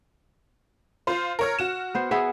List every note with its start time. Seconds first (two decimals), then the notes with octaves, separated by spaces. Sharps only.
1.07 F4 C5
1.39 A#4 C#5 F6
1.59 F#4 E7
1.95 B3 C5
2.11 B3 G#4 E5